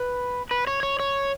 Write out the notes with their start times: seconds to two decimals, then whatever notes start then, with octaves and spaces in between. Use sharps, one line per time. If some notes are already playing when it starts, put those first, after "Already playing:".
Already playing: B4
0.51 B4
0.67 C#5
0.83 C#5
1.00 C#5